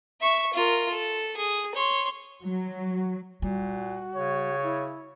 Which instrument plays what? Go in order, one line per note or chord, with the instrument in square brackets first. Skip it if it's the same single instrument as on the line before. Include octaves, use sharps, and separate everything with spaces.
[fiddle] E5 C#6
F4 A#4
A4
G#4
C#5 C6
[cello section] F#3
[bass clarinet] A#2 [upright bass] G3 [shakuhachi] F#4
[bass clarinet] C#3 [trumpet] C#5
[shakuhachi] E4